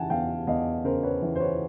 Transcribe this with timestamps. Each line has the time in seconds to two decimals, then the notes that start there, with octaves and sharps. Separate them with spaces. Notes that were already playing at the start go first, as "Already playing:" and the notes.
Already playing: C#3 E3 F#5 G#5 A5
0.10 E2 F5 G5
0.47 E2 D#5 F5
0.84 C#3 A#4 C5
1.03 B4 C#5
1.22 E3
1.35 C5
1.40 B4 C#5